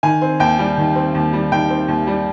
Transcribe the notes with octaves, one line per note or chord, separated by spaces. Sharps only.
D#3 G#5
C4
D#2 G5
G3
D#3
C4
D#2
G3
D#3 G5
C4
D#2
G3